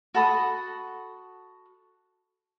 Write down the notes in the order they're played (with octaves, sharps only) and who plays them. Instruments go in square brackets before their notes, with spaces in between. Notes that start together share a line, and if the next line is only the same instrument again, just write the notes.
[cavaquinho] F#4 A4 B5 D#6